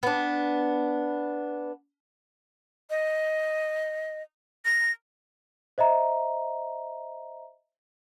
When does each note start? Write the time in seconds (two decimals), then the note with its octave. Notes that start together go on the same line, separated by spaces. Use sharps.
0.03 B3 D4
2.90 D#5
4.65 A#6
5.78 C5 D#5 E5 A#5